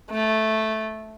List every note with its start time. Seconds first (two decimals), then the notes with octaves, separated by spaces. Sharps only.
0.11 A3